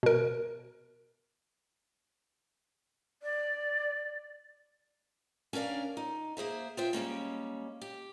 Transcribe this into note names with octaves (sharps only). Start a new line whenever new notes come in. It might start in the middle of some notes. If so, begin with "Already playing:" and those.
B2 A#4
D5
C#4 D4 A#4 D5 F5
D#4
A#3 G#4 C5 E5
F4 G#4 C5 E5 G5
G3 G#3 A#3 C#4
G4